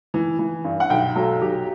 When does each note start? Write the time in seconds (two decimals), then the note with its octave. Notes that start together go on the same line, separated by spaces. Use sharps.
0.14 E3
0.39 E3
0.64 G2
0.80 F#5
0.90 B1 G5
1.16 F#3 A4
1.42 B1 G4